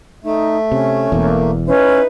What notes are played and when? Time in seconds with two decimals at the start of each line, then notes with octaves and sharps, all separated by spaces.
0.24 A3 D#4
0.72 C3 C#4
1.12 E1 E2 A#3
1.67 C#4 D#4 E4 B4